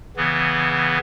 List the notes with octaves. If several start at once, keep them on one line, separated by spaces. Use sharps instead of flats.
C#3 E3 B3